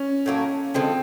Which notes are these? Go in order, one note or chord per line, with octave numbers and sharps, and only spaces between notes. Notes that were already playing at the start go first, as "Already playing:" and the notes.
Already playing: C#4
A2 F#3 A#3
D3 F3 G#3 C4